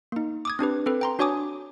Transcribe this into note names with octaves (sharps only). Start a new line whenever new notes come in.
A#3 D#4
D6 D#6 G#6
C4 D4 G4 B4
C4 A4 B4
G5 A#5 C6
D4 F#4 C#5 G#5 D6 D#6